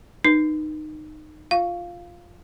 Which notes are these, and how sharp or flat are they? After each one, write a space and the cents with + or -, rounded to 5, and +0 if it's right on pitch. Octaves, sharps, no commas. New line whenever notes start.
D#4 -20 B4 -25
F4 +0 F5 +0